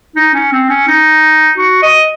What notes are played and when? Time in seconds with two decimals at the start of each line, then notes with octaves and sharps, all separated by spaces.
0.16 D#4
0.34 C#4
0.52 C4
0.69 C#4
0.87 D#4
1.58 F#4
1.83 D#5